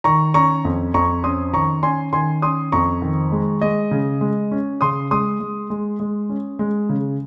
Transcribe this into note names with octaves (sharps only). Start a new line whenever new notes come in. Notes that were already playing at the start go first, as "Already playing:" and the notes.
D#3 A#5 C#6
C#4 A#5 C#6
F2
F2 A#5 C#6
C#4 C6 D#6
D#3 A#5 C#6
C#4 G#5 C6
D#3 G#5 C6
C#4 C6 D#6
F2 A#5 C#6
D#3
G#3
G#3 D#5
C#3
G#3
C#4
C#3 C6 D#6
G#3 C6 D#6
G#3
G#3
G#3
C#4
G#3
C#3